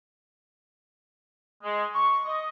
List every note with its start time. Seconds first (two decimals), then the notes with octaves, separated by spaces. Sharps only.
1.63 G#3
1.95 C#6
2.25 D#5